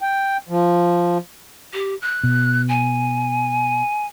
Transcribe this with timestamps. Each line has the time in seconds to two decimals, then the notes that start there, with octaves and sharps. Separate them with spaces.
0.01 G5
0.49 F3
1.73 G4
2.02 F#6
2.24 B2
2.68 G#5